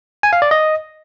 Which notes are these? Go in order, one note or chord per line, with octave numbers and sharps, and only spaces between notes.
G#5
F5
D5
D#5